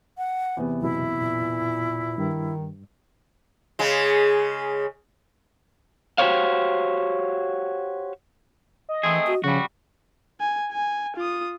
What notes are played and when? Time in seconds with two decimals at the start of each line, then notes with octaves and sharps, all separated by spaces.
0.18 F#5
0.57 E2 C3 B3
0.81 C#2 F#2 B2 E4
1.17 A#2
2.18 G2 D#3
3.79 C#3 G#3
6.18 F#4 G4 A4 C5 C#5 F5
8.89 D#5
9.03 E3 A3 C4 G#4
9.27 F#4
9.44 C#3 F3 G3 F#4
10.40 G#5
10.72 G#5
11.16 F4 D#6